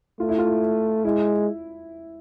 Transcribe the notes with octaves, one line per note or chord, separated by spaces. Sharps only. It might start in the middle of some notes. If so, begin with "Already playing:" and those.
A3 F4
E4
F4
G#3 E4